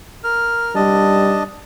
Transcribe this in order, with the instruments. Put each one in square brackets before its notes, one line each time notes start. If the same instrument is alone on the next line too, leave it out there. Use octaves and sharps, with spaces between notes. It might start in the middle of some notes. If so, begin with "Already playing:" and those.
[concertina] A#4 F6
[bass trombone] G3 [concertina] D4 D#5 A5